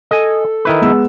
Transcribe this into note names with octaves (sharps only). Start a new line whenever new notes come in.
A4 D#5 G#5
D#3 E4 B4
G#3 B3 E6